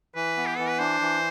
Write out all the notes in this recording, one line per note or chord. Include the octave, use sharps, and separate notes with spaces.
E3 B4
B3
G4
E3 A4
B4
D4 C5
E3